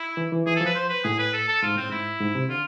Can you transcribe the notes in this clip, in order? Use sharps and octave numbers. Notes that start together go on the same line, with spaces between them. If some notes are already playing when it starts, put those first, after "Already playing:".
Already playing: E4
E3
E3
E3 G#4
A4
F3
B4
C5
B4
A2 G#4
B4
A4
A4
G#2 F4
A2 C4
G#2 E4
G#2
C3
D3 F4